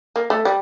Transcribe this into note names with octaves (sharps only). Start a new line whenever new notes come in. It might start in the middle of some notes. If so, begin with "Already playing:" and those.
A#3
A3
G3